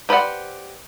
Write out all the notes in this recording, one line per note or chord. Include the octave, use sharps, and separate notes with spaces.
G4 B4 C5 D5 F#5